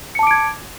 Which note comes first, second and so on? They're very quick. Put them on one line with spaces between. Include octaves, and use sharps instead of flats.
C#7 A5 D6 D7 G#6